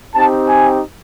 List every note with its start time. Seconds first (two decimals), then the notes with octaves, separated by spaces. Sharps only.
0.15 C4 D#4 G4 A5
0.48 G#5